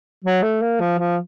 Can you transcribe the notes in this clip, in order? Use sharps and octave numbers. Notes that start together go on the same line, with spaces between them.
F#3
A3
A#3
F3
F3